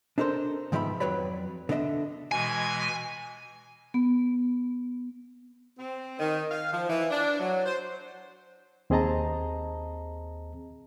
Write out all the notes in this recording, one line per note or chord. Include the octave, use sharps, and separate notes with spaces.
D4 D#4 A4 A#4 C5
G#2 D#3 F3 B3 E5 B5
F2 F#3 B4 C#5 D5 B5
D3 B3 D4 D#5 E5
B2 E3 G#3 G#5
B3
C4
D#3
F5
F3
E3
D4
F#3
C5
D#2 C4 G#4 D#5 A5 A#5